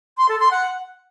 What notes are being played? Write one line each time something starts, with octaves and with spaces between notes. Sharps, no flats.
C6
A4
C6
F#5